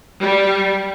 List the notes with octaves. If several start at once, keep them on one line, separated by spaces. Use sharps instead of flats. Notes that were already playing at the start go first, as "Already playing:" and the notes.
G3